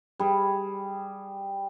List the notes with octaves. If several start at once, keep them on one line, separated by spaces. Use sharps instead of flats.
G3 G#4